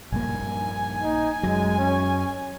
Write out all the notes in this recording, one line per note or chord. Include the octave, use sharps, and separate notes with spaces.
A#1 G2 A#3 G#5
D#4
F#2 F#3 G#3
C#4